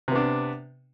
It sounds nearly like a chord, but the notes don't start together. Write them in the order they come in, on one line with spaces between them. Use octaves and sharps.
C3 B3 D4